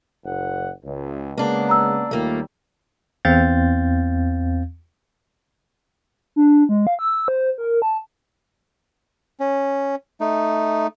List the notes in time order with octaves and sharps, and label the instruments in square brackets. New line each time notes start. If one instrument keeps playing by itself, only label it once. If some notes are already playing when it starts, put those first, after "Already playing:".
[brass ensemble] F#1 F#5
C#2
[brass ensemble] C#3 G#3 B3 [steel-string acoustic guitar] A#3 D4
[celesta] A#5 E6
[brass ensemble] D#2 G3 [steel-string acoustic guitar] A3 A#3 F4
[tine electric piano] E2 C4 F5 G6 A6
[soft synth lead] D4
G#3
F5
E6
C5
A#4
A5
[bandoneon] C#4
A3 D#4